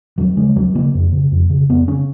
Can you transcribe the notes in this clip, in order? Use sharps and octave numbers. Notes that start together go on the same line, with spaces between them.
D#2 F#3
C#3 G#3
D#2 F#3
C#3 A#3
F2
C#3
F2
C#3
F2 B3
C#3 C#4